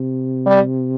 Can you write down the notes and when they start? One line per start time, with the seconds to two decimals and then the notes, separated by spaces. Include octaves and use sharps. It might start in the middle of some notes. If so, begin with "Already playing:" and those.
Already playing: C3
0.46 G3